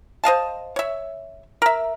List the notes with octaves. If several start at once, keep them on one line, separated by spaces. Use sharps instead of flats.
C5 D#5 F5 A5
C#5 E5
A#4 E5